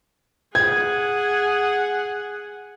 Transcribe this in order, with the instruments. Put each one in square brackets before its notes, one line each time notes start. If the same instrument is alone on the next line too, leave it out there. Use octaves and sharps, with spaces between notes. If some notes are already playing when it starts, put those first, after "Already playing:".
[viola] G#4 F#5 [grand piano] G#6